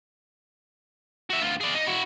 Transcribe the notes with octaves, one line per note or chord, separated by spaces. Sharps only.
F#4 E5
D2 F4
G#4 D5
D#4
E4 F#4